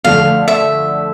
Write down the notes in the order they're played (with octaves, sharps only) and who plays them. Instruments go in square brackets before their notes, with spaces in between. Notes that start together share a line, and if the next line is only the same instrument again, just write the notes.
[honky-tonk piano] D3 F3 A3 [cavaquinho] F5
[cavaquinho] E5